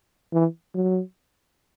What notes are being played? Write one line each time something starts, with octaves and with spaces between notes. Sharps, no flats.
E3
F#3